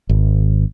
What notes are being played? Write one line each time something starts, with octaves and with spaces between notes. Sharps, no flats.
G#1